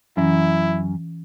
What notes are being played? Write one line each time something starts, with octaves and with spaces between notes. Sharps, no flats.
F#2 E3 C#4 E4